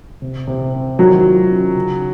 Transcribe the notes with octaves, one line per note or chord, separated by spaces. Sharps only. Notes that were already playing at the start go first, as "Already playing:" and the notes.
C3
C3
C4
D#3 F#3
F4
C#4
C#3